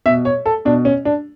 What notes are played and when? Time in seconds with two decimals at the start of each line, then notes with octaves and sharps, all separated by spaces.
0.06 B2 E5
0.25 C#5
0.46 A4
0.65 B2 D4
0.85 C#4
1.05 D4